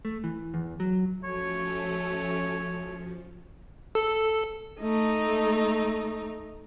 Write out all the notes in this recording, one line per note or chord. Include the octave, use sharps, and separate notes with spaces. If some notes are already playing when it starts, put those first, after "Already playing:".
A3
E3
E2
F#3
F3 A3 C#4 F#4 C#5
A4
A3 D#4